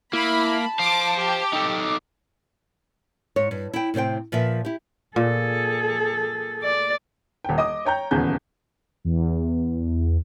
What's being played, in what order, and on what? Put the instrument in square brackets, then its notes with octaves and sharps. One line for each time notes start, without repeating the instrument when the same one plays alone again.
[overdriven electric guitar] A#3 [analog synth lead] E4 [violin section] B5
[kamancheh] A5
[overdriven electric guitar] C5 F5 [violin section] D6 [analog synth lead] C7
[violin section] G4 [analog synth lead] D6
[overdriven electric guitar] D#4 A4
[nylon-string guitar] G#2 C#5
G2
E4 G5
A2 C3 C4 C5 G5
A#2 F3 B4 E5
E4 G4
[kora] A#2 [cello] G#4 A4
[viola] D5
[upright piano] D#1 G5
D#5 D6 D#6
C#5 G5 A#5 G6
D#1 E2 C#3 G#4 G6
[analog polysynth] E2